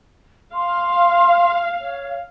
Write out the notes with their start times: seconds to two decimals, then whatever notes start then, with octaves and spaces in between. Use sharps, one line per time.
0.54 F5 C6
1.80 C#5